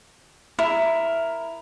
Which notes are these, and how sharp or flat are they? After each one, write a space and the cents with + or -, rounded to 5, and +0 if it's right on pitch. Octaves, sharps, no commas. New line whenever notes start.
E4 +5 A#4 +0